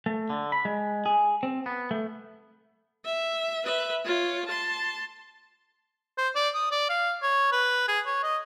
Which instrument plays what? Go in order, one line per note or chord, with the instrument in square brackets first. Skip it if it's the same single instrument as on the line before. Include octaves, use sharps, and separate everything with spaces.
[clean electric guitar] A3
D3
B5
G#3
G#4
C4
B3
A3
[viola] E5
B4 E5
F4 C#5
A5 C6
[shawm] C5
D5
D#6
D5
F5
C#5
B4
G#4
C#5
D#5